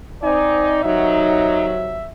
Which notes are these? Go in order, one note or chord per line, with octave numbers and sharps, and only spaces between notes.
C4 D#4 D5 G#5
C3 D#3 F#3 D#4 E5